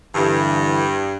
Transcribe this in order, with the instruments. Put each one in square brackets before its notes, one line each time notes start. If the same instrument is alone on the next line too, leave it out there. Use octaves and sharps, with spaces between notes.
[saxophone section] G2 [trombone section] D3 E3